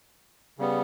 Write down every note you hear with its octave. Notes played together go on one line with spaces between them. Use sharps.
C#3 G3 B3